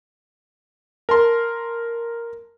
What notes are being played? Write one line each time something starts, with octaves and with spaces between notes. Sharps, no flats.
A#4 A5 C6